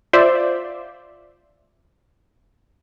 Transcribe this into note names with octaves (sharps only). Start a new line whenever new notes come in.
F4 C5 D5 E5